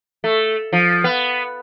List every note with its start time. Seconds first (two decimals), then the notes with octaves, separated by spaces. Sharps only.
0.24 A3
0.73 F3
1.04 B3